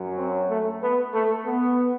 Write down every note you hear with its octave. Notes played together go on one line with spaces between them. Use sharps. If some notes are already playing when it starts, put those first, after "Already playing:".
Already playing: F#2 F#3
C4
A3
B3
A3
B3